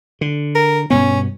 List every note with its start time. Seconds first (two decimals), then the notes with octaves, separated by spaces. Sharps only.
0.21 D3
0.55 A#4
0.90 G2 B2 B3 C#4